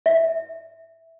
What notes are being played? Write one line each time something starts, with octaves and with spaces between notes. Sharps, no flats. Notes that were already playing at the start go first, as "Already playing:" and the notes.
E5